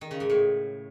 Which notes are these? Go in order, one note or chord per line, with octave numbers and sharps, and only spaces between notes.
D#3
C#3
G#2
A2